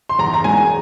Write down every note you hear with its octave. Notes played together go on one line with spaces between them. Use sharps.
C6
E2 A#5
A#5
E1 G#5